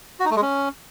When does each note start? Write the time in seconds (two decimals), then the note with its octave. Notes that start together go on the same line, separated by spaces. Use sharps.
0.20 F#4
0.25 D#4
0.31 A3
0.36 G#3
0.42 C#4